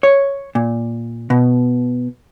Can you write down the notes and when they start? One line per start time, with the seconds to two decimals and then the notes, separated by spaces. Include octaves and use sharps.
0.03 C#5
0.55 A#2
1.30 B2